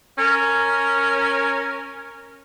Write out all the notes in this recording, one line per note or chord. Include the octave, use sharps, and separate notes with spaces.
C#4 A#4